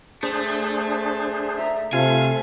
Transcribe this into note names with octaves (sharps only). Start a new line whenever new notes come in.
A3 D4 G#4 C5
E5 A#5
C3 A3 F4 F5 G#5